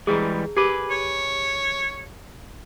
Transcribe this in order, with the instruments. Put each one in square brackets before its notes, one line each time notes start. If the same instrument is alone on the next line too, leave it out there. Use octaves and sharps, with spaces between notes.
[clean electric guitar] E3 G3 G#3 [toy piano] G#4 A#5
[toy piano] G4 A#4 D6 [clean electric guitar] G#4 B4
[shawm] C#5